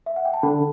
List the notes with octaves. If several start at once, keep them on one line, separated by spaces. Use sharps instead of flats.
E5
F#5
G5
A5
D3 B5